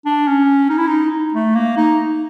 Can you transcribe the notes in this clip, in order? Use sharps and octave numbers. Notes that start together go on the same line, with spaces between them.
D4
C#4
D#4
E4
D#4
A3
A#3
D#4